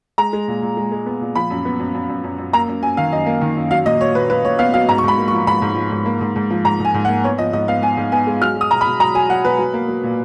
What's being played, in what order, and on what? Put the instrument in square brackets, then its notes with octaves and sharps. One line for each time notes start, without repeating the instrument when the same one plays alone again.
[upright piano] G#3 A#5
G#3
A#2
A#2
G#3
G#3
B3
A#2
F3 B5
F#2
B3
F#2
F#2
F#2
F#2
F#2
A#3 A#5
F#2
F#2 G#5
D#3 F5
F#2 D#5
A#3
D#3
F#2
F#3 F5
A#2 D#5
F#3 C#5
A#2 B4
F#3 B4
A#2 C#5
B3 F5
F#3 F5
G#2 A#5
C#6
G#2 B5
A#3
C#6
F3
G#2 B5
G#2
F3
G#2
A#3
G#2
G#2
F3
G#2 A#5
G#2 G#5
G#2
F#5
A#3
B3 C#5
F3 D#5
G#2 D#5
B3 F5
B3 G#5
G#2
B3 G#5
G#3
F#3 F6
F#3 D#6
B2 A#5
B5
B2
F#3 A#5
F#3 G#5
F#3 F#5
B2 B4
F#3
A#3
F#3
A#2